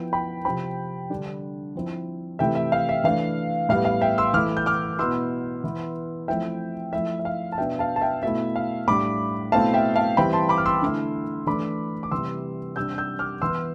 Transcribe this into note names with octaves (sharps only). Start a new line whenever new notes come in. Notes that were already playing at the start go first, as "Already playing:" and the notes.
Already playing: F3 B3 E4 G5
G5 B5
C3 F3 C4 G5 B5
D3 G3 D4
F3 C4 E4
C3 E3 A3 E4 E5 G5
E5
F5
E5
E3 A3 D4 F5
A2 G3 B3 F5
F5
E5 G5
C6 E6
E3 A3 E4 D6 F6
G6
D6 F6
B2 B3 E4 C6 E6
E3 B3 E4
F3 A3 C4 E4 E5 G5
F3 A3 E4 E5
E5
F5
A5
B2 B3 D4 E5 G5
F5 A5
A5
E5 G5
B2 A3 E4 E5
F5
A2 G3 D4 B5 D6
B2 A3 C4 E4 F5 A5
E5 G5
F5 A5
E3 G3 C4 E4 G5 B5
A5 C6
B5 D6
F6
C6 E6
D3 A3 E4
E3 A3 D4 B5 D6
D6
C3 E3 G3 C6 E6
C3 G3 D4 E6 G6
E6 G6
D6 F6
E3 B3 E4 C6 E6